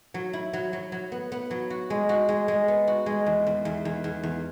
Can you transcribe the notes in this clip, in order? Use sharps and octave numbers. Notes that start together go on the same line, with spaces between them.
F#3
E4
F#3
F#3
F#3
B3
B3
F#3
F#4
G#3
F#4
G#3
G#3
B3
F#4
G#3
E2
E2
E2
E2
E2
E2